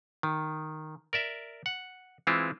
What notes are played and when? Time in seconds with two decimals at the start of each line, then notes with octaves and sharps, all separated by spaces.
0.23 D#3
1.13 A#4 D5 E5
1.66 F#5
2.27 E3 G#3 C4 E4 F4